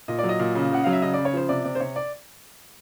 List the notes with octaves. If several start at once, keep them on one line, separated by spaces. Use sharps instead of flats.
A#2 D#5
F#3 D5
D#5
A#2
C#3
C#3 F#5
F#3 F5
E5
C#3 D#5
C#3 D5
C#5
F3 C5
C3 D5
C3 D5
C5
C3 C#5
D5